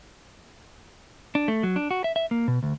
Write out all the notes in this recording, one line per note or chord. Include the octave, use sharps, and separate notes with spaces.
D4
A3
F#3
D4
F#4
E5
E5
A#3
B2
D2